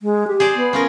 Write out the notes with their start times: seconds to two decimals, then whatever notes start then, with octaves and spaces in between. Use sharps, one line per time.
0.02 G#3
0.28 G4
0.40 G#4 C5 D5
0.56 B3
0.73 C#4 F4 A#4